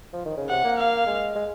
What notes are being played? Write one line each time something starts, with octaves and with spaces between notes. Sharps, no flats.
F3
D#3
C#3
C3 F#5
A#3
F5
G#3
G#3